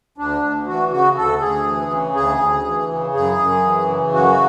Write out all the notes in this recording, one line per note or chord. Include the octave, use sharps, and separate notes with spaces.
D2 D4
D2
E3 F#4
C#3 F#4
D2 A4
D2 G#4
E3
C#3
D2 G#4
D2
E3
C#3
F#2 G#4
F#2
E3
C#3
F#2 F#4